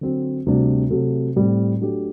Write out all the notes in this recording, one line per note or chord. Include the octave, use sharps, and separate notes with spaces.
D3 F#3 C4
D2 C3 G3 D4 F#4
C3 F#3 A3
A2 G3 C4
F#3 A3 D4 G4